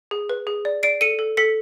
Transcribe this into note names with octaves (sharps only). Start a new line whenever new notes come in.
G#4
B4
G#4
D5
D5 C7 D7
A4 C#7 D#7
A4
A4 B6 C#7